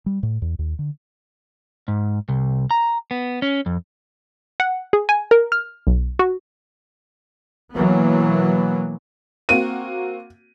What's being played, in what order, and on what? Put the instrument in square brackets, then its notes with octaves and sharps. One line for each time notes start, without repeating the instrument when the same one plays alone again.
[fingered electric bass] G3
A2
E2
D#2
D3
[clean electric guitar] G#2
C2
A#5
B3
C#4
F2
[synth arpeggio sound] F#5
G#4
G#5
A#4
F6
B1
F#4
[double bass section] B2 E3 F#3 A#3 B3
[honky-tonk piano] A#3 C4 F#4 [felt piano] D#7